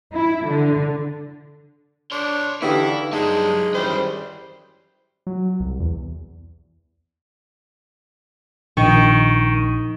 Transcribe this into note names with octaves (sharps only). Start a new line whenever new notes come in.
E4
D3
D4 C#5 C6
D3 E3 D#4 E4 G4 F5
G2 F#3 G#3 D#4 A5
F#2 D#3 E3 G3 G#4 C5
F#3
C2
E2
A#1 D#3 C#6